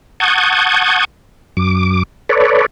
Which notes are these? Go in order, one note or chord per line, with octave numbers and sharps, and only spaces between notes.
F#5 A5 C#6 D#6 G6 G#6
F#2 D6
A4 B4 C#5 D5